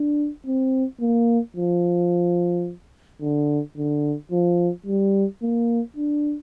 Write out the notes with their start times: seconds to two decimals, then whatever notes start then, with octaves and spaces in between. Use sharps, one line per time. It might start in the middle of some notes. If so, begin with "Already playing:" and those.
Already playing: D4
0.46 C4
1.01 A#3
1.57 F3
3.21 D3
3.77 D3
4.31 F3
4.87 G3
5.42 A#3
5.97 D4